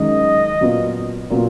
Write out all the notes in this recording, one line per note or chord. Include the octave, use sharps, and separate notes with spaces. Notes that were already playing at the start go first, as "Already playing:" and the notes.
Already playing: F#2 D#3 G#3 D#5
A#2 F#3 B3 F4
A#2 F#3 B3 F4